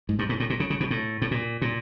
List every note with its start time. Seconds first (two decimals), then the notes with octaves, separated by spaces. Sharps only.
0.09 G#2
0.19 G2
0.29 G#2
0.40 A2
0.50 A#2
0.60 C#3
0.70 C#3
0.80 B2
0.91 A2
1.22 A2
1.31 A#2
1.62 A#2